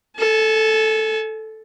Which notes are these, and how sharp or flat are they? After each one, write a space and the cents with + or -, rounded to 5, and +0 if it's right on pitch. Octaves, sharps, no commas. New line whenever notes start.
A4 +0 G#5 +45